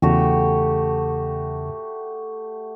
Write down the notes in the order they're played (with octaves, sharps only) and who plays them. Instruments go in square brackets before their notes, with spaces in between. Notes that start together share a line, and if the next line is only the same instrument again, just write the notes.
[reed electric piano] E2 C#3 [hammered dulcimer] A3 F#4 G4